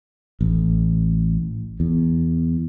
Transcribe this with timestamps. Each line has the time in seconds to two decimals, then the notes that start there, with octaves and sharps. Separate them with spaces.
0.41 A1
1.80 E2